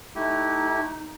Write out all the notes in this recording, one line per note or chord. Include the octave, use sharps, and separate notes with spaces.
A3 D#4 E4 G4